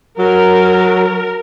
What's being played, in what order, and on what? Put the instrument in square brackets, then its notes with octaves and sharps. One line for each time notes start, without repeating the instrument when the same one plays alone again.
[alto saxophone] F#3 [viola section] A#4